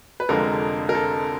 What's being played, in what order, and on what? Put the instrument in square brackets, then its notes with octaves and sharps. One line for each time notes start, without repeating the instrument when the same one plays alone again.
[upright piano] B4
F1 F2 D3 F3 G#3 A#4
A#4
A4